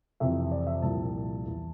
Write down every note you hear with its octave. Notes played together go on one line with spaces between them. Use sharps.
F2 C3 E3 E5
D5
E5
C2 A#2 F3 A5
E2 E3